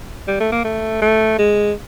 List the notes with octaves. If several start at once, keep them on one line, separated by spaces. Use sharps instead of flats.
G3
A3
A#3
A3
A3
G#3